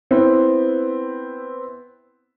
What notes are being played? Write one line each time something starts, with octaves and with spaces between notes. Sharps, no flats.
B3 C4 E4 B4